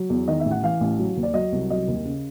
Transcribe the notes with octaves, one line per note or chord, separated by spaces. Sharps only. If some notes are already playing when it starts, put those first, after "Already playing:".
Already playing: F#3
E2
D#3 D#5
E5
A1
F#5
E3 F5
A1
F#3
D#2
D5
F#3 D#5
C2
F#3 D#5
D#2
C#3